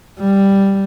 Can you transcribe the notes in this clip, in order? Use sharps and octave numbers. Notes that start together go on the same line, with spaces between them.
G3